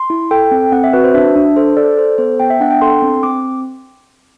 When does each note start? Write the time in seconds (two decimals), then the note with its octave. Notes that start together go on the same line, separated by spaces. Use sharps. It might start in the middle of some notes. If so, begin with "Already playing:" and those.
Already playing: C6
0.10 E4
0.31 A4 G5
0.51 C4
0.72 C4 F#5
0.84 E5
0.93 F#4 B4
1.04 C5
1.14 D4 E5
1.36 D4
1.56 A4 C5
1.77 A4 D5
1.97 A4 C5
2.18 B3 C5
2.40 B3 G5
2.50 E5
2.60 D4 F#5
2.71 G5
2.82 A4 C6
3.02 C4
3.23 C4 D6